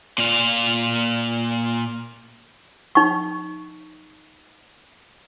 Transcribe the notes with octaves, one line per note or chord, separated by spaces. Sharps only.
A#2 F4
D#4 C#6